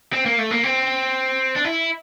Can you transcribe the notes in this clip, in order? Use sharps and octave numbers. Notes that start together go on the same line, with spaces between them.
C4
A#3
A3
A#3
C4
D4
E4